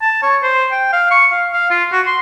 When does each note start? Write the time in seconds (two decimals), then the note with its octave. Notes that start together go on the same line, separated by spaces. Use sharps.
0.02 A5
0.22 C#5
0.43 C5
0.72 G5
0.93 F5
1.11 C#6
1.31 F5
1.52 F5
1.70 F4
1.92 F#4
2.07 C6